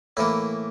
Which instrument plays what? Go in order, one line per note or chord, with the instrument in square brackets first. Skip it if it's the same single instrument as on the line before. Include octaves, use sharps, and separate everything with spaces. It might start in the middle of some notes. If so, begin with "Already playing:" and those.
[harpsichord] A2 E3 A#3 E4